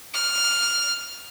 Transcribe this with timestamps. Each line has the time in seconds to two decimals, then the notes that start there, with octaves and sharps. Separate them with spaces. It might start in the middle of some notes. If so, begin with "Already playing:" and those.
0.14 F6